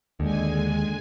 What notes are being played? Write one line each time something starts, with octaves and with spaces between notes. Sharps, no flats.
D#2 D3 G#3 G#5